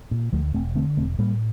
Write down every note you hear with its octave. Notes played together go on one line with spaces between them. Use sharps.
A#2
D2 F3 A3
E1 A3 C4
D3 A3 C4
E1 A3 C4
A2 G3 A#3